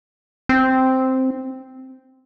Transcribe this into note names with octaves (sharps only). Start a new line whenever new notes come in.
C4